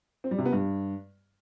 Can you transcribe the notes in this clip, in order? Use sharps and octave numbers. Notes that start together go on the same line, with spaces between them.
C4
G3
C3
B3
G2